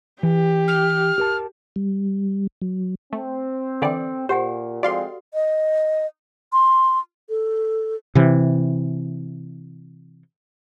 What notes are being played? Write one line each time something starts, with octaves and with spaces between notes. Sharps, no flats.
E3 G4
F6
G4 A#4 A5
G3
F#3
A3 C4
D3 E3 A4 D5 G5
A#2 G4 C5 F#5 G#5
F3 G#3 C4 F#4 A4 D5 F5 C6
D#5
C6
A4
C3 E3